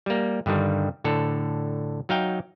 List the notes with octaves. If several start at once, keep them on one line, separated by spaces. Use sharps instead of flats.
G3 A#3
G2 D3 D#3 G3
A2 D3 A4
F#3 D#4 F5 G5